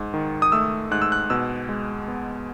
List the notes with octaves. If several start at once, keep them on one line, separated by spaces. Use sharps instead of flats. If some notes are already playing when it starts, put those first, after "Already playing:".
Already playing: G#2
D#3
D#6
A3 E6
G#2 F#6
E6
F#6
B2 E6
G#3
B3